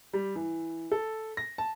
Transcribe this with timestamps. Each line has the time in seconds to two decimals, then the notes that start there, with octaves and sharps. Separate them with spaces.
0.13 G3
0.36 E3
0.92 A4
1.37 A#6
1.58 A5